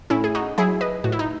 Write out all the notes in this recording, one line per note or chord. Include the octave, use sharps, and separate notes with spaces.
A2 C#4 E4
G#4
D#4 F#4
F#3 E4 G#4
B4 D#5
A2 F#4
E4
D#4